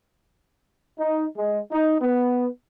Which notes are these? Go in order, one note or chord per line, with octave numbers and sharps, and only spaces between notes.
D#4
G#3
D#4
B3